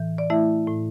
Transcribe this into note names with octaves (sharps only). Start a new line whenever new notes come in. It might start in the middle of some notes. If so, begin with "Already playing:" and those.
Already playing: A2 E3
D5
A3 E4 E5
A2